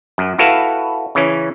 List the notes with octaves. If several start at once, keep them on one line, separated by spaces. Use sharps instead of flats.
F#2
E4 F#4 A4 B4 F5
C#3 E3 C#4